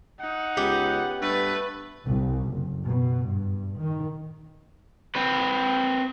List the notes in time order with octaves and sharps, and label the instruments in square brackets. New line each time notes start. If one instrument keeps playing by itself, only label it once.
[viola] D#4 [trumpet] F#5
[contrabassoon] C#2 [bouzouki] B3 G4
[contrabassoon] G2 [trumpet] A3 [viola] B4
[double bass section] C2
F#1
B2
G2
D#3
[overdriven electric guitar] C4 B4